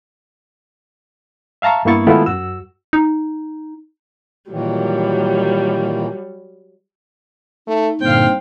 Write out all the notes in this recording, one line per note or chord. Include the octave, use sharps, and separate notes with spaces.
E5 F5 A5 A#5 C#6
G2 A#3 B3 E4 C#6 A6
D#3 G#3 A3 B3 E4 F4
F#2 F#4 E6
D#4
A#2 D#3 E3 F#3 G3
A3 D#4
G2 A#2 D3 C4 F5 G5